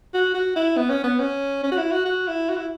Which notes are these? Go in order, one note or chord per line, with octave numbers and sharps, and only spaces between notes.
F#4
F#4
E4
B3
C#4
B3
C#4
C#4
F#4
E4
F#4
F#4
E4
F#4
E4